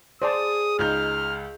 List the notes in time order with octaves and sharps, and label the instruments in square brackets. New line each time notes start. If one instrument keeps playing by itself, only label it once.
[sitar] G#4 [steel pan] C5 D5 A5 [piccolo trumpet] D#6
[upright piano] C#2 D#4 G6 [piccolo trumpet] F6